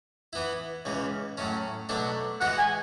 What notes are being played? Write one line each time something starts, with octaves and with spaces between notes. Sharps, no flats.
E3 B3 E4
C#2 C#3 E3
A2 F#3 A3 C#4
B2 F#3 A3 D4 A4
E3 G#3 B3 F#4 F#5
G#5